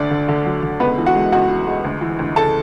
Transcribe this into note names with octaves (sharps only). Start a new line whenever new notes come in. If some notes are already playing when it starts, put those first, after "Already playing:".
Already playing: D2 D3 D4 D5
D3
D3
F#3
D3
C#2 B3 B4
E3
F#4 F#5
G#3
C#2 F#4 F#5
E3
G#3
D2
E3
D2
C#3 A4 A5